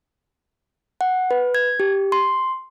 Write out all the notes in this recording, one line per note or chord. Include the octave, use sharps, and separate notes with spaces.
F#5
B4
G#6
G4
C6